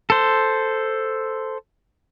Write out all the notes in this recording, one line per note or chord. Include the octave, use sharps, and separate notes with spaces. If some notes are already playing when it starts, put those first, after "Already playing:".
A4 C5